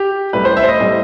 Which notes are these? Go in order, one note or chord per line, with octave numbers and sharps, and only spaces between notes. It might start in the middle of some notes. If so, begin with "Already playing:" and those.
Already playing: G4
A2 G3 B4
C5
E5
C5
D#5
A2 G3